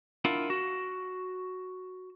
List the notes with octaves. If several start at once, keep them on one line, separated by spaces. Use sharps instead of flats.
D4 E4 F4 A#4 F5 F#5
F#4